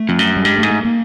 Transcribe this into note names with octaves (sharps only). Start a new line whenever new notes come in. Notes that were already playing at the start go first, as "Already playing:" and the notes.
Already playing: A3
F2
F#2
G3
G2 G#3
A3
G#2
A3
A#3